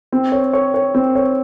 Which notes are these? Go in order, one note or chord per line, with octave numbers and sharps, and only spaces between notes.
C4
C#5
C#5
C#5
C4
C#5